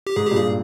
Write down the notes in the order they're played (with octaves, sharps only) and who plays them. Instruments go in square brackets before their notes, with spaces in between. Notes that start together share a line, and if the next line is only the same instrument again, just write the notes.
[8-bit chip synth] G4
[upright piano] G#2 [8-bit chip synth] G#4
[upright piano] G2 A#2 [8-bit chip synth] G4
[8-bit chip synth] G#4